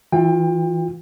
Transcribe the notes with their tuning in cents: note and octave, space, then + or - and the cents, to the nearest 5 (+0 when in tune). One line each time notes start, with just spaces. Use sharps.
E3 +0 F4 +35 G5 +30